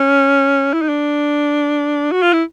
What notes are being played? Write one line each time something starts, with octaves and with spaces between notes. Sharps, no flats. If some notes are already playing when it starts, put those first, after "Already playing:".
Already playing: C#4
E4
D#4
D4
F#4
F4
E4